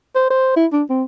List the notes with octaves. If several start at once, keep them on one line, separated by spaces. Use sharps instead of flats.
C5
C5
E4
D4
C4